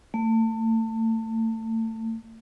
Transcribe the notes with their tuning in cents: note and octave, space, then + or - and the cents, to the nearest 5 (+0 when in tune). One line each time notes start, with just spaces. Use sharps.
A3 +30